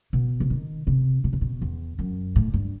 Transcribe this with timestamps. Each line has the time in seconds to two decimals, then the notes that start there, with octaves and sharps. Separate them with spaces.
0.13 B2
0.40 C3
0.50 D#3
0.87 C3
1.24 B2
1.33 C3
1.41 B2
1.62 E2
1.99 F#2
2.36 A2
2.54 G2